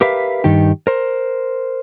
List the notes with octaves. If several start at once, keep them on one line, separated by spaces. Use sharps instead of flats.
G4 A#4 B4 E5 F5
G2 D#3 D#4 G4
A#4 C5